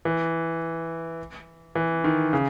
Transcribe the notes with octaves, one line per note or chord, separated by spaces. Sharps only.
E3
E3
D#3
C#3